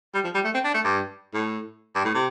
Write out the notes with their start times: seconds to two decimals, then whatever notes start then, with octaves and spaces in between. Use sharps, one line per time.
0.14 G3
0.24 F3
0.34 G3
0.44 A3
0.54 C4
0.64 D4
0.74 A3
0.84 G2
1.34 A2
1.95 G2
2.05 A2
2.14 C3